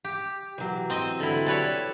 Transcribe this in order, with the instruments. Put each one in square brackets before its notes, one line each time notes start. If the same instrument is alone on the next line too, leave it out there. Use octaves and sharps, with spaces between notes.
[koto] G4
[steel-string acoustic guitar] E3 F#3
[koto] C4 D#5
D3 E4
[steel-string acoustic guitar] G4 D5 [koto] A4 B4 C#5